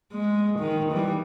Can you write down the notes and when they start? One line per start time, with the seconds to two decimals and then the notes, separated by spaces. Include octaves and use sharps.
0.13 G#3
0.59 D#3
0.92 E3 G3